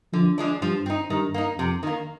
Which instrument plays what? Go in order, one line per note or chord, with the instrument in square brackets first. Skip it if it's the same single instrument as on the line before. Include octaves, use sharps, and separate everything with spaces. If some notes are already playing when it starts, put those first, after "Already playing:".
[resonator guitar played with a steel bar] D3 [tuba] F3
[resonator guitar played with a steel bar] F3 G#3 D4
[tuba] G2 [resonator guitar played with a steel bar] F3
[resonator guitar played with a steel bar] C4 D#4
[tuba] G2 [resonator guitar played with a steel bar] D#3
[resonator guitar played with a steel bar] A#3 D#4
[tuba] F2 [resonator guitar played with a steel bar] C3
[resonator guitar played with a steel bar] D#3 A#3